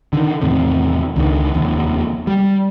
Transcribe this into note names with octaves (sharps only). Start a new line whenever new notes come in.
D3 D#3
E2 A2 C3 D#3
C#2 D3 D#3
F1 D#2
G3